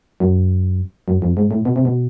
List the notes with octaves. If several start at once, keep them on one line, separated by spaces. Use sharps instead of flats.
F#2
F#2
F2
G#2
A2
B2
C3
B2